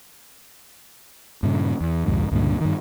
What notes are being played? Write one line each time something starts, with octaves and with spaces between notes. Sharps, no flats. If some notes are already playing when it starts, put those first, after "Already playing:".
G2 A#2 C#3
E2
C2 F2 G#2 D#3
C#2 G2 A#2 D3
G2 D#3